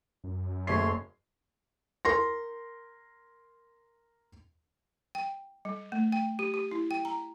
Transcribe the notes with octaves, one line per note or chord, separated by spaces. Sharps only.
F#2
F#1 A3 C#5 C6 C7
A#4 C6 A#6
G5
G3
A3
G5
G4
G4
E4
G5
A#5